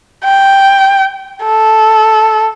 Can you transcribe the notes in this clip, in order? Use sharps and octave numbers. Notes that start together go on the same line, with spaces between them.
G5
A4